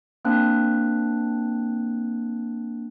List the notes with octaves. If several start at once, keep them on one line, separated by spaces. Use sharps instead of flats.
A#3 C4 D4 F#6